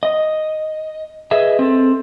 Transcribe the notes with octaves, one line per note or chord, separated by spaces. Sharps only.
D#5
G#4 B4 D#5 E5
C4 A4